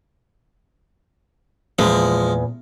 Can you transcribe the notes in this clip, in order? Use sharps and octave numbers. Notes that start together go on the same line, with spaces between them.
E2 A#2 F3 G#3